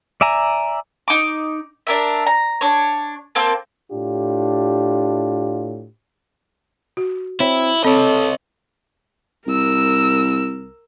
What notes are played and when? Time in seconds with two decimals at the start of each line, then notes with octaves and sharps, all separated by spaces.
0.21 D5 E5 G#5 A#5
1.08 D#4 D6
1.87 D4 A#4 E5
2.27 A#5
2.61 D4 C#5
3.35 A#3 C4 A5
3.92 A2 D4 F4 G4
6.97 F#4
7.40 C4 E4 C#5
7.85 C4 A4 C#5 D#5
9.47 C2 A#4 E6